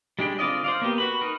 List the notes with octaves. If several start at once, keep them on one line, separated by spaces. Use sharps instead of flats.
G3 G#3 D4 G5 B5
D3 C4 F4 D5 D#5
C5 D5 F5
A#3 B3 G4
F#4 B4 B5
D#4 A#4